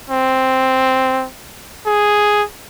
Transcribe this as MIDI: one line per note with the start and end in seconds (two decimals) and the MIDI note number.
0.10 1.26 60
1.87 2.43 68